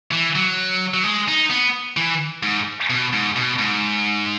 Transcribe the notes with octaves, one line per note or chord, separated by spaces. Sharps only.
E3
F#3
F#3
G#3
D#4
B3
E3
G#2
B2
G#2
B2
G#2